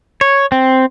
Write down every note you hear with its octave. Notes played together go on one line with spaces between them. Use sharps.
C#5
C4